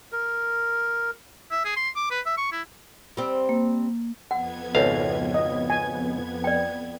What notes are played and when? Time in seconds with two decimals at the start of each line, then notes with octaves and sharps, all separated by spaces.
0.12 A#4
1.51 E5
1.65 G#4
1.76 C6
1.96 D6
2.11 B4
2.26 E5
2.37 C#6
2.52 E4
3.17 G3 C4
3.49 A#3
4.31 F2 B3 F#5 G#6
4.75 G#1 C#2 A4 B4 C#5 F5
5.34 D#5
5.70 G#5
6.44 D5 G5